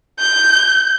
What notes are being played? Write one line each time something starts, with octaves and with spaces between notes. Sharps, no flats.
G6